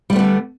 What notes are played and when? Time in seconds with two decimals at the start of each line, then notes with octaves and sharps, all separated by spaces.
0.10 G3
0.13 A3
0.16 B3
0.19 D3